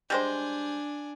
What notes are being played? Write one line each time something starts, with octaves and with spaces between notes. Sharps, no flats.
G3 G#3 D4 C5 G#5